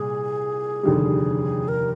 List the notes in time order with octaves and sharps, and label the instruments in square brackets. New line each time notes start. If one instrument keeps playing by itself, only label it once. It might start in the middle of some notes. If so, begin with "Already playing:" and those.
Already playing: [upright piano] C2 A#2 [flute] G#4
[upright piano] F1 D#2 D3 G3
[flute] A#4